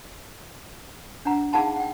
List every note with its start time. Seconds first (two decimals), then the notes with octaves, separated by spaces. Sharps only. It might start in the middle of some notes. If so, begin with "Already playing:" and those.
1.25 D4 F#5 A#5
1.53 D#4 G#4 F5 F#5 A5 B5
1.76 F#5 G5